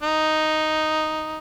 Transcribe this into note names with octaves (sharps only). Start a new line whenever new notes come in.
D#4